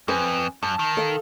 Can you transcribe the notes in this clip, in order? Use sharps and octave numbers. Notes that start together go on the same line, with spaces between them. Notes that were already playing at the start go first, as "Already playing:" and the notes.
F2 C4 B4 G#5
F#2 A5
D#3
A4 F5